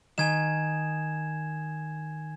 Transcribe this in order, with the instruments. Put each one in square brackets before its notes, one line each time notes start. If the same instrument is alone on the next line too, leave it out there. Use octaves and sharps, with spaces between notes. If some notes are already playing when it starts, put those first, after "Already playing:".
[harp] D#3 [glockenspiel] G#5 G#6 E7